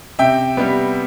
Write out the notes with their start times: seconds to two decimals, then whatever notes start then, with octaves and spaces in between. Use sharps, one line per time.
0.19 C3 E5 G5
0.57 G3 B3